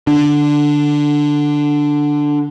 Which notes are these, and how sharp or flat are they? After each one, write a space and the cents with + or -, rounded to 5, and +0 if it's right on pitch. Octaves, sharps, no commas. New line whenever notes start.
D3 +10 D4 +0